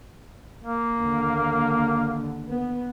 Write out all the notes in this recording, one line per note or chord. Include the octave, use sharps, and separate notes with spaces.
A#3
D#2 D3
B3